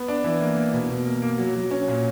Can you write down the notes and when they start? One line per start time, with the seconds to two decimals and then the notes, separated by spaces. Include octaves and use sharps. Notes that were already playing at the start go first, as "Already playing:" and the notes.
Already playing: B3
0.08 D4
0.24 E3
0.41 A#3
0.56 A#3
0.73 B2
0.89 B2
1.06 A#3
1.22 A#3
1.38 F#3
1.55 F#3
1.71 C#4
1.88 A#2